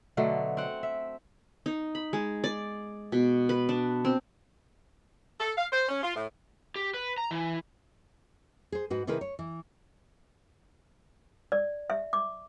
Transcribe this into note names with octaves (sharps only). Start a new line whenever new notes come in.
B2 D3 F#3 A3
C4 F#5
E5
D#4
B5
G#3
D5
B2
B4
D4
C4
A4
F5
C5
C#4
F4
A2
G4
B4
A#5
E3
G#4 C5
G#2 F#4 B4
C3 D#3 E4 G#4 A#4 B4
C#5
E3
D5
E5
D6